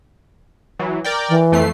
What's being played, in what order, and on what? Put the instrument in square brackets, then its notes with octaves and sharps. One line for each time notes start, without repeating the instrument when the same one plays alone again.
[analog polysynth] E3 F#3
A#4 D5 G5
[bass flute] E3
[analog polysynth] F2 A3 C7